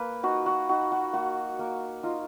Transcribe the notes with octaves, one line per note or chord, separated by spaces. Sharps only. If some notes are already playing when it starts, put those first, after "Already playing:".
Already playing: A#3 B4
D#4 F#4
F#4
D#4 F#4
F#4
A#3 F#4
A#3
D#4 F4